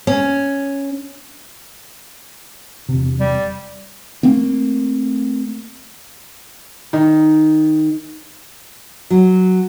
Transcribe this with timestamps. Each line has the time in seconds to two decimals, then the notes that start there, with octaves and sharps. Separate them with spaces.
0.07 C#4
2.89 E1 C3
3.20 G3
4.23 A3 A#3 C4
6.93 D#3
9.10 F#3